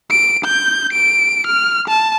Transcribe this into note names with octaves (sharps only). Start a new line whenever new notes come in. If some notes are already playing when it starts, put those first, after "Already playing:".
D7
G6
D7
F6
A5